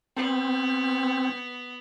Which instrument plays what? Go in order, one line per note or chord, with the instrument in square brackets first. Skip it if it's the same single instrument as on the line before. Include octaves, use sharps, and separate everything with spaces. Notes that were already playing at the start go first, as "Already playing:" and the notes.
[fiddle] B3 [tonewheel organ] C4